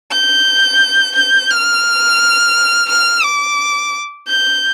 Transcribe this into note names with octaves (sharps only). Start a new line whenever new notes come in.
G6
G6
F6
F6
D6
G6